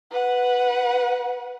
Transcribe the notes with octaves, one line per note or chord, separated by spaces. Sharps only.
B4 F#5